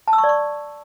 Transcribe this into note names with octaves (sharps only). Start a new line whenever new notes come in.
A5
E6
C#6
D5
C#6